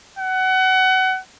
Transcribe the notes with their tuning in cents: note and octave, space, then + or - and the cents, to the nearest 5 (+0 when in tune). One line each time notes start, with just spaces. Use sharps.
F#5 +25